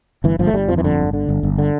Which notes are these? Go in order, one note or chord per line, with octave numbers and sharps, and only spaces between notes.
G1 E3
G1 F3
A3
G1 G3
F2 F3
E3
G1 D3
G1
D3
G1
G1
D3